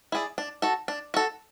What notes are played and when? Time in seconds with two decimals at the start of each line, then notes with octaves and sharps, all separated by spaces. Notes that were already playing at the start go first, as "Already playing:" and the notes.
0.12 E4 G#4 D5
0.38 D4
0.62 F#4 A4
0.88 D4
1.14 F#4 A4